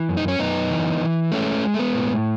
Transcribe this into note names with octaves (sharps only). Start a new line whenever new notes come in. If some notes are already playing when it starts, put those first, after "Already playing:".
Already playing: E3
F#2
D#4
C#4
F#2 B3 D#4
E3
E3
G#3 A3 C#4
G#3
A3
B3
A2